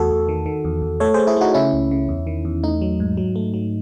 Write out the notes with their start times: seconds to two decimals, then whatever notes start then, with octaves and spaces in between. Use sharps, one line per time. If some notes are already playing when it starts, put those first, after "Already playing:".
Already playing: E2 A3 F#4 A4
0.10 E2
0.28 D#3
0.46 D#3
0.65 E2
0.82 E2
1.00 A3 A4 C#5
1.14 A3 G#4 C5
1.27 E4 G#4
1.37 A3 D#4 F#4
1.54 C#3 C#4 E4
1.73 C#2
1.91 C#3
2.09 E2
2.27 D#3
2.45 E2
2.63 A3 D#4
2.81 F#3
3.00 G#2
3.17 F#3
3.36 A3
3.54 F#3